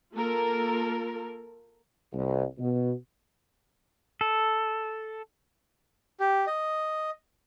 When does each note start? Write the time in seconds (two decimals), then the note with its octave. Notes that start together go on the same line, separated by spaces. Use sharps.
0.16 A#3 F4 A4 A#4
2.13 C2
2.58 B2
4.21 A4
6.20 G4
6.47 D#5